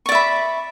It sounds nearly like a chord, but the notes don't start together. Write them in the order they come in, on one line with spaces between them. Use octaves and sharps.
C#6 D5 E5 B5